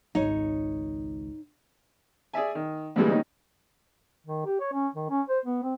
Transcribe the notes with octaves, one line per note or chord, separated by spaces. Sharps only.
G#1 C#2 D#4 C#5
G#4 D5 E5 G#5
D#3
D2 A#2 E3 G3 G#3
A#2 D#3 C#4 D#4
D#3
G4
C#5
C#4
D#3
C#4
C5
B3
C4